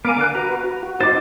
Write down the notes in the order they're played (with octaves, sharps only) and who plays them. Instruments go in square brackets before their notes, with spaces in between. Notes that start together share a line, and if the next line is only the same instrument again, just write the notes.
[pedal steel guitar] B3 G#5 [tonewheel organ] A#4 F5 D6
[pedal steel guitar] D3 F#6
[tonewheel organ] F#4 B4 [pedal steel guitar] A#5
[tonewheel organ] F#4
[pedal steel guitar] C4 F4 C5 [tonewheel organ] D#4 [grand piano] D6 A6